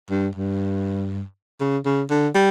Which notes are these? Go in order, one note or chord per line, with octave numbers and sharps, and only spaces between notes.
G2
G2
C#3
C#3
D3
G3